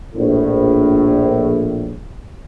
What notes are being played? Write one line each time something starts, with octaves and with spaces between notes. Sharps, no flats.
A#1 A2